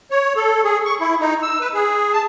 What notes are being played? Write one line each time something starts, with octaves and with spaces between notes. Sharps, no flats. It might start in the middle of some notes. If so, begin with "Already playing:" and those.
C#5
A4
G#4
C#6
E4
D#4
E6
B4
G#4
A5